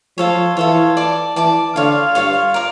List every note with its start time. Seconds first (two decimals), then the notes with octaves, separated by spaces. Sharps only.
0.18 F3 F4 A4 C#5
0.57 E3 F4 A4 C#5
0.97 D5 A5 D6
1.36 E3 D5 A5 D6
1.76 D3 F4 C#5 F5
2.15 G2 F4 C#5 F5
2.54 A#4 D5